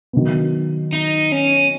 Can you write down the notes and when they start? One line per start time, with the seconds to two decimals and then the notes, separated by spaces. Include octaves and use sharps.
0.13 D#3 F#3 B3
0.93 D#4
1.32 C#4